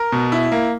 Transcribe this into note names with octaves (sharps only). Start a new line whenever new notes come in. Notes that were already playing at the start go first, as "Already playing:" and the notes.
Already playing: A#4
B2
E4
A#3